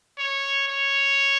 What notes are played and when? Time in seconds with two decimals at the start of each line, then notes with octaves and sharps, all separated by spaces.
0.18 C#5
0.68 C#5